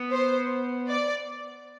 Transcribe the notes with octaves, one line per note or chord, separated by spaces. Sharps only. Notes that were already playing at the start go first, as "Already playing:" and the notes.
Already playing: B3
C5
D5